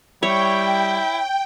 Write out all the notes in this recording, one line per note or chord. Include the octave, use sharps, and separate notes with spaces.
G3 E4 C#5 G5